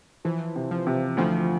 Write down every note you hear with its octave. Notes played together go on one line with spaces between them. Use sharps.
E3 F3
C3
F3
C3
D2 F3